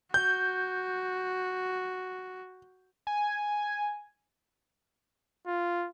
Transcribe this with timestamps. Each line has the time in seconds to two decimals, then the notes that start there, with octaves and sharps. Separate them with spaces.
0.14 F#4 G6
3.07 G#5
5.47 F4